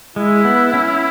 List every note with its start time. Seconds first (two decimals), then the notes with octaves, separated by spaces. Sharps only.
0.16 G#3 E4
0.45 B3
0.74 C#4